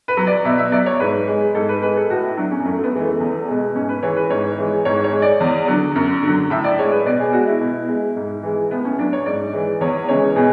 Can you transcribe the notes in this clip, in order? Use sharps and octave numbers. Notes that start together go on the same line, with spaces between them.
B4
F#3
D5
B2 E5
E5
F#3 D5
C#5
G#2 B4
G#3
G#2 A4
B4
G#3 B4
A4
A2 F#4
E4
F#3 D4
C#4
F#2 A3
A3
B3
E3 G#3
A3
E2
B2 G#3
G#2 C#4
B4
E3 G#3 C#5
B4
G#2 C#5
E3 G#3
G#2 C#5
C#5
G#3
D5
E2
D3 F#3
F#2
D3 F#3
A2 E5
D5
G#3 C#5
B4
B2 D5
G#4
G#3 F#4
E4
B2
G#3
G#2
E3 G#3
A2 B3
C#4
F#3 D4
C#5
G#2 D5
E3 G#3
E2 C#5
C#3 E3 G#3 C#5
B2 G#4